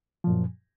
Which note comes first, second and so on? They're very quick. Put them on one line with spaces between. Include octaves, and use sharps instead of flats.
F3 A#2 F#2